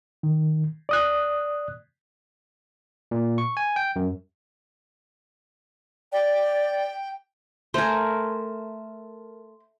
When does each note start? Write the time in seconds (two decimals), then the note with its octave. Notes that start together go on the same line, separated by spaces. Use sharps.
0.23 D#3
0.89 D5 D#6 F#6
3.11 A#2
3.38 C#6
3.57 G#5
3.76 G5
3.96 F#2
6.12 D5 G5
7.74 A3 A#4 C5 G#5